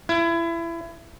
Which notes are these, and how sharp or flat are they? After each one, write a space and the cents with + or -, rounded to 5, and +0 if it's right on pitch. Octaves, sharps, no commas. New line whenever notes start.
E4 +25